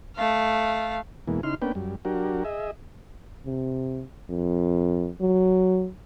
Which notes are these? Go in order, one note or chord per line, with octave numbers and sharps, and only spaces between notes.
A3 F5
E2 B2 E3 G#3 A#3
C#3 D#4 E4 C6 F6
A#3 B3 C#4 D4 B4 G5
F#2 G3
F#3 D4 F#4 G4 A#4
G#4 D#5 E5
C3
F2
F#3